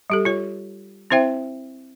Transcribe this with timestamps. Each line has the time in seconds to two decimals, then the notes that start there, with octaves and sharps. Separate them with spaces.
0.10 G3 G4 A4
0.25 F4 C#5
1.11 C4 E4 C5 E5 G5